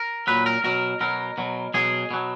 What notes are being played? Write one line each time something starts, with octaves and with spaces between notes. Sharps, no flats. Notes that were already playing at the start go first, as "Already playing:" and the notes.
Already playing: A#4
A#2 F#3 B4
A#4
B2 F#3 A#4
B2 F#3 A#4
B2 F#3
B2 F#3 G#4
B2 F#3